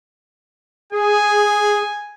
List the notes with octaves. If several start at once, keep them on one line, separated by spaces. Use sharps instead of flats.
G#4 G#5